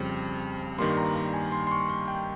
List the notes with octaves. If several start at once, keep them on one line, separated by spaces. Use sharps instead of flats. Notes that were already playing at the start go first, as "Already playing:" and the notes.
Already playing: F2 C#3 G3 C4
G2 D#3 G3 A#3 C6
A#5
A#5
G#5
C6
C6
C#6
C6
G5